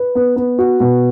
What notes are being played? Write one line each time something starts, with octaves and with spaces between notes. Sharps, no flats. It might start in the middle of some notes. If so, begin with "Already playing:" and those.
Already playing: B4
B3
B3
F#4
B2